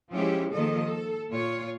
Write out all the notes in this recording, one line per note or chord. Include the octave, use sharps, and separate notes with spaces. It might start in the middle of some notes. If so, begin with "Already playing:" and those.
F3 G#3 C#4 E4 G4
D#3 F3 A#3 A4 D#5
A4
A#2 F4 C#5